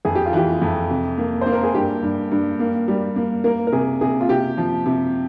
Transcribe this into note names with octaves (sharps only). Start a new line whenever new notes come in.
F2 G#4
G4
F4
E3 G4
F2
C3
A#3
A#3 C5
A#4
G#4
G2 G4
G2
G2
A#3
G3
A#3
A#3 A#4
A#4
C3 G#4
C3 G#4
F4
C3 G4
F3
C3